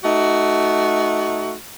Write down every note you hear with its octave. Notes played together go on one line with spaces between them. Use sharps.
A3 D#4 F#4